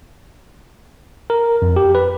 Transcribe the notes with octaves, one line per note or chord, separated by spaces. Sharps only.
A#4
F2
G4
B4